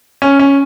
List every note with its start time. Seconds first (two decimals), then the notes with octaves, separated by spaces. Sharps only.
0.22 C#4
0.39 C#4